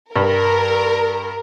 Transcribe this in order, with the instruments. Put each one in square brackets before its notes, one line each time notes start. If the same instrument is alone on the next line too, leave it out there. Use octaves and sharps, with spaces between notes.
[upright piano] G2 [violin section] A#4